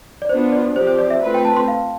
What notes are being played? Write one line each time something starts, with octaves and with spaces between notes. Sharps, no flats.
D5
B3 D4 F4 C5
D5
F3 C4 G4 C5
C5
D5
E5
A3 C4 F4 B4
G5
A5
C6
F5